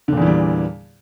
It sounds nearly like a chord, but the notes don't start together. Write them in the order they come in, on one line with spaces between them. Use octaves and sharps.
D3 A#2 E2 E3 G3